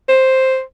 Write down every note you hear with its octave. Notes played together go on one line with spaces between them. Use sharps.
C5